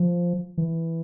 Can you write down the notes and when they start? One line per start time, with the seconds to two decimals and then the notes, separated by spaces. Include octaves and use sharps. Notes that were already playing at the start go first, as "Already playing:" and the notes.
Already playing: F3
0.58 E3